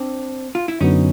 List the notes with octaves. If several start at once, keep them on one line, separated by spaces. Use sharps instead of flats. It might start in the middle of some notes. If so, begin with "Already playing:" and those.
Already playing: C4 D4
F4
E4
F#2 D3 F#3 B3 C#4 D#4